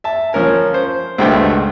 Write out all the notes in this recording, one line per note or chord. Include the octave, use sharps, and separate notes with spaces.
E5 A5
F3 C#4 A#4 G#5
C5
C#2 G2 B2 A3 C5 G5